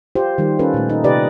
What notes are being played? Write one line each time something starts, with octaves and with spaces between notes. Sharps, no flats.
F4 G4 C5
D#3 G3
C#4 F4 A4 B4
A#2 A3
D#4
C3 G4 B4 D5 D#5